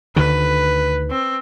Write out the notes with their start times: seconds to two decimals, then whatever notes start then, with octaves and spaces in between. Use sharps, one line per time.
0.16 D2 D3 D#3 B4
1.10 C4